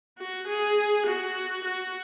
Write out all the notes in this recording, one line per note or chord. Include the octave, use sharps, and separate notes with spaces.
F#4
G#4
F#4
F#4